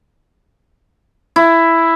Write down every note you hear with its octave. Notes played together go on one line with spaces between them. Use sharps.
E4